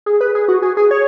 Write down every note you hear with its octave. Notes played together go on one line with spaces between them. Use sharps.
G#4
B4
G#4
F#4
G#4
G#4
C#5